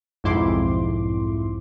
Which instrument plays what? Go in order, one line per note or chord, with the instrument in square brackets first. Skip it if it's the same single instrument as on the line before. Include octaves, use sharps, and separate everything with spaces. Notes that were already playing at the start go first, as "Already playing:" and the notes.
[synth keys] B1 F2 G#2 E4 C6 D6